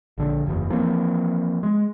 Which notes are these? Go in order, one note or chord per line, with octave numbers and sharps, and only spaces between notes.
A#1 D3
F#1 E2
E3 F3 A#3 C4
G#3